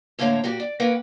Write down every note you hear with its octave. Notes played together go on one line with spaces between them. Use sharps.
A2 D3 A#3 C5 C#5 A#5
A#2 A#3 F#4 G4
D5
A#3 C#4 A#4 B4 F#5 G5